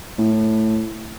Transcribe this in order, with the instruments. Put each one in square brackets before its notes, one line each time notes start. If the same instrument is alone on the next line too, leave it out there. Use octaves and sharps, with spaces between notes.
[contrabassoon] A2